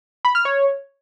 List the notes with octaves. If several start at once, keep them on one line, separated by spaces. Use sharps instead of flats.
B5
F6
C#5